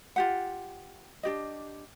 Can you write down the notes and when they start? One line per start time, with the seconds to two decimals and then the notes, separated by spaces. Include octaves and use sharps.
0.16 F4 G4 F#5
1.23 D4 G4 D#5